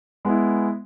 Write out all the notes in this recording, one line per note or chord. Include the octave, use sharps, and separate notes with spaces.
G#3 B3 E4